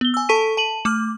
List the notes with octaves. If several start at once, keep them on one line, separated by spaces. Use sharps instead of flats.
B3 G7
G#5 E6
A4 A5 C#6 B6 D#7
A5 D#7 F#7
A3 D6 F6